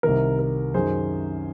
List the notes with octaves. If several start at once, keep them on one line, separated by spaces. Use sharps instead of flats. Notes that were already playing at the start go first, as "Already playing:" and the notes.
C2 C3 D#3 A#4
A#4
F#2 D#3 G#4 C5